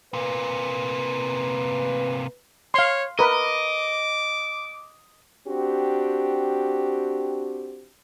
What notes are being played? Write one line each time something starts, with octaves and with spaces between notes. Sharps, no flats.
C3 A#3 B4
C#5 F5 C6
A#4 B4 D#5 D6
C4 D4 F#4 G4